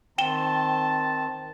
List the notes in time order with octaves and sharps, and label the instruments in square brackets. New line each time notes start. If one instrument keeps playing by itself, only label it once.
[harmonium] D#3 C4 [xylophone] G5 E7 G7 [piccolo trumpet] A5